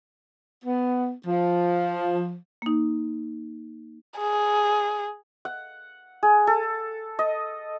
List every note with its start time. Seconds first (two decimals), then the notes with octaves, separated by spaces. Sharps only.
0.64 B3
1.26 F3
2.62 A#3 D#4
4.18 G#4
5.45 F#5
6.23 G#4
6.47 A4
7.19 D#5